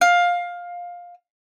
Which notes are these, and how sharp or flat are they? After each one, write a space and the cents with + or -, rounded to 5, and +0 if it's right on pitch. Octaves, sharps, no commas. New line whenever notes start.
F5 +15